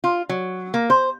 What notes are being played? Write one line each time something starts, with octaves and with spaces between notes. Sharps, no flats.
F4
F#3
A#3
C5